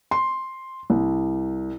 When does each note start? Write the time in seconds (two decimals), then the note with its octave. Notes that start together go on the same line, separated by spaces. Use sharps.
0.11 C6
0.90 C2